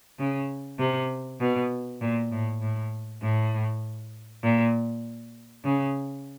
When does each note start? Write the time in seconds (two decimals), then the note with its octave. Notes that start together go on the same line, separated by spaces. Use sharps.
0.19 C#3
0.79 C3
1.40 B2
2.01 A#2
2.31 A2
2.61 A2
3.22 A2
4.43 A#2
5.64 C#3